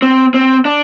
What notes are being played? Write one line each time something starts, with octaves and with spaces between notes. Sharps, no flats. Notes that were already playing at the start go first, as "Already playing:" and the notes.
C4
C4
D4